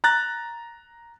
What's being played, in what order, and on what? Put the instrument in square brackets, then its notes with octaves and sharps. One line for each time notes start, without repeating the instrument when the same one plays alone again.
[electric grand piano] A#5 F#6 A6